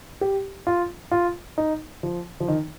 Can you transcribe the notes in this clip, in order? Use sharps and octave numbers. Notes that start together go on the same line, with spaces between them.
G4
F4
F4
D#4
F3
F3
D#3